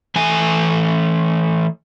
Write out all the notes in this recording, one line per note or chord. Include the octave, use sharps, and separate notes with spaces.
E3 A3 G#5